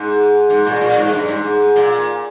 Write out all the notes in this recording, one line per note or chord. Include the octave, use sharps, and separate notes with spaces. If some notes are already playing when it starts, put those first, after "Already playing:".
Already playing: G#2
G#2
A#2
A#2
G#2
G2
G#2
A#2